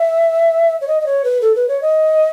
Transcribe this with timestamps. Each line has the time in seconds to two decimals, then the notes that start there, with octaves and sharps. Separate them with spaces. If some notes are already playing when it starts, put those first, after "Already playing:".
Already playing: E5
0.81 C#5
0.88 D#5
1.01 D#5
1.06 C#5
1.24 B4
1.42 A4
1.56 B4
1.68 C#5
1.82 D#5